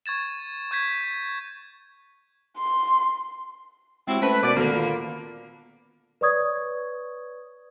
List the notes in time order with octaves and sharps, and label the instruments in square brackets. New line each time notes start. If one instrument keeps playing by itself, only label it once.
[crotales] C#6 G#6 A6 E7
C#6 G6 G#6 B6
[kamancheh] C6
[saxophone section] C3 F#3 E4 [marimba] G#3 [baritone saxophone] C4
[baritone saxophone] A3 [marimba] C#4 C5 [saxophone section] B4
[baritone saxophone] B2 [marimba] A#4 [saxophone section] D5
[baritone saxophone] D2 [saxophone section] D3 A#3 [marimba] D#3 B3
[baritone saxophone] A#2 [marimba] B5
[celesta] B4 C#5 D5 C#6 D#6 G#6